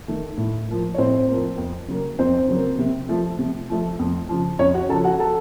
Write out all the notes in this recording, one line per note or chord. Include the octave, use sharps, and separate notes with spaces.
D#3 A3
A2
F3 A#3
C#5
A2 C4 C5
F3 A#3
F2
C#3 F#3 A#3
F2 C4 C5
C#3 F#3 A#3
C3
F3 A3
C3
F3 A3
F2
C#3 F3
F2 C#4 C#5
F#4 F#5
C#3 F3 A4 A5
F#4 F#5
A4 A5